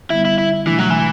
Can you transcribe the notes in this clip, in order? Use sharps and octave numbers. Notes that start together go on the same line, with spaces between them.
D3 G3 B3 E4
E4
E4
B2 E3 A3 D4
F#3
E3